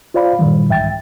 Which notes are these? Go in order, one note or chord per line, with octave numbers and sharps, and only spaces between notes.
F4 C5 D5 F5 B5
G2 A#2 D#3 E3 G3
C2 G#2 E5 G5 A6